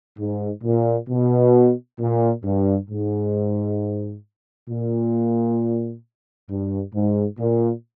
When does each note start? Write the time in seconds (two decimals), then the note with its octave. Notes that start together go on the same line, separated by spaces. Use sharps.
0.18 G#2
0.64 A#2
1.09 B2
1.99 A#2
2.44 G2
2.90 G#2
4.69 A#2
6.50 G2
6.94 G#2
7.39 A#2